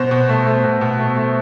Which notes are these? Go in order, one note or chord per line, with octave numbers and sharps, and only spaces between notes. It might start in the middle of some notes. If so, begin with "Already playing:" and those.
Already playing: B2 C5
B2
A3
A3
B2
B2
A3
A3